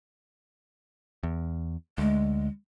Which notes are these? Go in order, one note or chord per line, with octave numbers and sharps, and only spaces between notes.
E2
D2 G#3